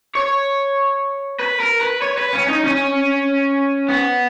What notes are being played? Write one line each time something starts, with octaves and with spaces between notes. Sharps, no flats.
C#5
B4
A#4
B4
C#5
B4
C#4
D#4
C#4
B3